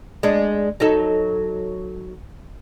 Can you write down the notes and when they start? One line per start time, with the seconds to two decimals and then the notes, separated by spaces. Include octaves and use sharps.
0.23 G#3 D4
0.80 F#3 D#4 A4